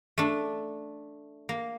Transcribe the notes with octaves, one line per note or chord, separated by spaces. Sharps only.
A3 D4
A#3